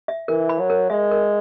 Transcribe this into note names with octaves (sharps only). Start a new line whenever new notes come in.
E5
E3 A#4
B5
F#3
A#4
G#3 E5
A#4